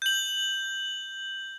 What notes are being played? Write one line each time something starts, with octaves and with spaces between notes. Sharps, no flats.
G6 F#7